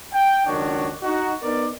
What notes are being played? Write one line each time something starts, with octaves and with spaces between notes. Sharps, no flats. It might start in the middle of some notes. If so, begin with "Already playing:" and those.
G5
F#1 C#2 D#3 D4 F#4 C#5
D#4 F#4
B3 D#4 A#4 D5